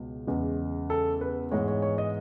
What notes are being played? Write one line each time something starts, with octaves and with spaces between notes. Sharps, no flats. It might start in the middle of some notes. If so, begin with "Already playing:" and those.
Already playing: C#2 B2
E2 C#3 G#3 B3
A4
B4
G#2 E3 G#3 B3 C#5
C#5
C#5
D#5